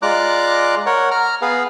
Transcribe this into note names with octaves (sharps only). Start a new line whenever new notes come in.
G#3 F4 D5 A#5 D6 F#6
A#4 C#5 F#5
A#5 F6
B3 G#4 B4 F5